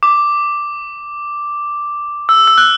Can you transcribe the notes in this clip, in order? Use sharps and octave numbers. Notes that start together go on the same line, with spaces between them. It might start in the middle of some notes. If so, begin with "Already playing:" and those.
D6
E6
E6
F#6